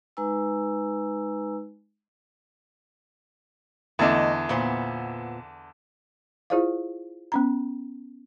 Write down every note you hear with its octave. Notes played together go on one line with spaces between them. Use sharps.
G#3 D#4 B4 G#5 A#5 E6
E2 D3 A3 D#5
A#2 B3 C5
E4 F4 G#4 C5 D5 F5
B3 C#4 A#5